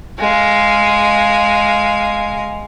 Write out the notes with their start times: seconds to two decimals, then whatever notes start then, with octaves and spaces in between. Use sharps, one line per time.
0.19 G#3 F5